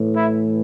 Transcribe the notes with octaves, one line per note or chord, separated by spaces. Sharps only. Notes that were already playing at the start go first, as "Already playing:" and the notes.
Already playing: A2 E3
E4